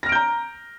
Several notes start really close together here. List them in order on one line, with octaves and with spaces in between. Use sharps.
A#6 F6 D7 G6 A#5